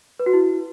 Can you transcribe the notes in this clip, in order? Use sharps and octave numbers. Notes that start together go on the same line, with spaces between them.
B4
F#4
E4